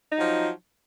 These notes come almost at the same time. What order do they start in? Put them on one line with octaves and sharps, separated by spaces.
D#4 F#3 F3